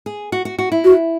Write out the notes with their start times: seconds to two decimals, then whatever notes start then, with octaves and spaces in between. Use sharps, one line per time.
0.06 G#4
0.32 F#4
0.45 F#4
0.59 F#4
0.72 E4
0.84 F#4